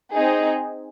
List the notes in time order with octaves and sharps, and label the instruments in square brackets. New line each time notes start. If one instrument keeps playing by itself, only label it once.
[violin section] C4 D#4 G#4